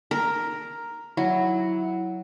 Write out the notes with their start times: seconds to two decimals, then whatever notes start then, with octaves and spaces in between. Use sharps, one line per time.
0.11 A#4
1.17 F#3 E4